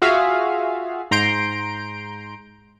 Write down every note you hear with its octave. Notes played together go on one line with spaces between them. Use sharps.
F4 F#4 G#4 E5 F5
G#2 A#5 C6 G6 D7